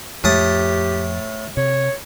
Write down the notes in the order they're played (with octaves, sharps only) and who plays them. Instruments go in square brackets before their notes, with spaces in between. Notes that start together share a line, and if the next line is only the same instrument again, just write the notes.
[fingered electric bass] F2 [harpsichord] A2 A5 D#6 [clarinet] G4
[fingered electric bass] C3 [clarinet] C#5